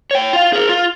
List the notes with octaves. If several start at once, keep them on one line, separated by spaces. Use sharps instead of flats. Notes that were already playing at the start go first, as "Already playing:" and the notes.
C#5 G5
F4 F5
G#4 A#4
F4